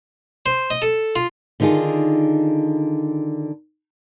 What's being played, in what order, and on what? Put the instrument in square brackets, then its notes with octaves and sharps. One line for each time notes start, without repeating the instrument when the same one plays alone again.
[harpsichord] C5
D#5
A4
F4
[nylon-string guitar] D3 D#3 D#4 F4 G#4